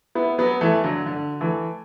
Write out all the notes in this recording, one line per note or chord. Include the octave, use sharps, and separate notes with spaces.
B3 E4
F#3 B3
E3 A3
D3 F#3
D3
E3 A3